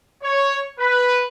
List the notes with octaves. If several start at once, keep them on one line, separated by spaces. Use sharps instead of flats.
C#5
B4